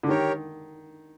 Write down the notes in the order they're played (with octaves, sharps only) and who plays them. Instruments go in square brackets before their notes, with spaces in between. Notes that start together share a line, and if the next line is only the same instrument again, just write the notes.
[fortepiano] D3
[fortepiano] D#3 [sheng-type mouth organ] G4 A#4 C#5